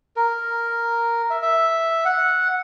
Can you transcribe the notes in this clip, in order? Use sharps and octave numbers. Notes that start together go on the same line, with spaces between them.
A#4
E5
E5
F#5